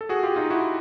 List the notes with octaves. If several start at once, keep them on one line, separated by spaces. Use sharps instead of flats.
A4
F#4 G#4
F4 G4
D#4 F4
E4 F#4